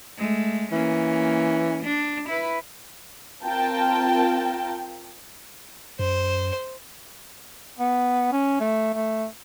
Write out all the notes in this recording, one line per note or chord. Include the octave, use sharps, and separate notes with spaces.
G#3 A3
E3 A#3 C#4
D4
E4 B4
C4 F4 A#4 G5 A5
F#2 C5
B3
C#4
A3
A3